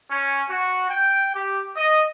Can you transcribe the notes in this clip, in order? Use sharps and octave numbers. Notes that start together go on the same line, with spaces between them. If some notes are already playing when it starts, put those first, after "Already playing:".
C#4
F#4
G5
G4
D#5